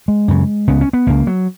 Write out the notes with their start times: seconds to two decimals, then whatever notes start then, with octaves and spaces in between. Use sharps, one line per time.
0.08 G#3
0.28 F#2 C#3
0.68 C#2 C#3 B3
0.81 C#4
0.93 B3
1.07 C#2 C#3 A#3
1.27 F#3